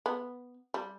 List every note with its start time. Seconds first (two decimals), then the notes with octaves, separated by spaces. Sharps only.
0.06 B3
0.74 G3